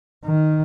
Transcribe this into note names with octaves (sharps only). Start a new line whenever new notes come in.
D#3